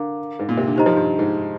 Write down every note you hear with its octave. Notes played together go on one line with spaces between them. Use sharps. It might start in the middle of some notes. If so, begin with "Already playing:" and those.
Already playing: D3 A#4 F5 A#5 D6
G#2
A#2
C3
D3
D#3 D#4 G4 C5 D#5 A#5
F3
G2
G#2